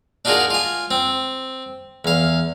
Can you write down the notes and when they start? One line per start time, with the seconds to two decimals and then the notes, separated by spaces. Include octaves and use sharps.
0.25 D4 D#4 F4 F#4 G#4 A#4
0.50 F4 G#5
0.91 C4
2.05 E2 F5